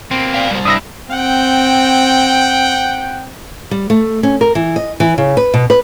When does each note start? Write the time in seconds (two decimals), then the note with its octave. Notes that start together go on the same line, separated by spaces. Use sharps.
0.11 B2 A#3 C4
0.34 D5 F5
0.51 G3 C5
0.65 G2 D4 E4 D#6 E6 A#6
1.12 C4 F#5 G5
3.71 G3
3.90 A3
4.23 C#4
4.41 A#4
4.55 E3
4.76 D#5
5.00 E3
5.18 C#3
5.37 B4
5.54 B2
5.70 B4